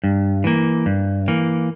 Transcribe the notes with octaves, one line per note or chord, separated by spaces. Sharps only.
G2
E3 A#3
G2
E3 A#3